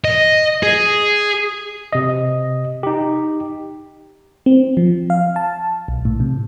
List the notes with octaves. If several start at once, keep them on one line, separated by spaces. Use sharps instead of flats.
D#5
G#4
C3 D#5
D#4 G4
C4
F3
F5
A5
B1
A2
C3